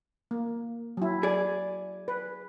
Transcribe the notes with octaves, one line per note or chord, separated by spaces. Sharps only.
A#3
F#3 E4
G#4 D5
B4